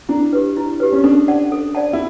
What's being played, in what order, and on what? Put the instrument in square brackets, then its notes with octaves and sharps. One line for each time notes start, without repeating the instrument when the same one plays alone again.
[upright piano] D4 [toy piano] E4
[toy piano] G4 B4
E4
G4 B4
[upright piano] C#4
[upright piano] D4 [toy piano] A4
[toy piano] D5 F#5 A5
A4
D5 F#5 A5
[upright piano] E4